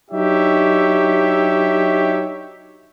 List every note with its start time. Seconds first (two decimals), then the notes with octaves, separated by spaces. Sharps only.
0.11 F#3 D4 D#4 G4 C#5 E5